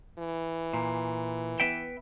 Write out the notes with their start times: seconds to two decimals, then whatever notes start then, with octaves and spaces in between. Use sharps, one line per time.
0.19 E3
0.73 A#2
1.60 B3 E5 G5